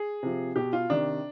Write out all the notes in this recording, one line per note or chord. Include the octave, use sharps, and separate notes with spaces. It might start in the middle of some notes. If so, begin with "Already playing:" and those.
Already playing: G#4
C3 F3
B2 G4
F4
C3 D#3 D4